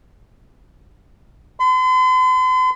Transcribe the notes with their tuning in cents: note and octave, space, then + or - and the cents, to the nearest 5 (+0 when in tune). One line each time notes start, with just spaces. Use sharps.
C6 -45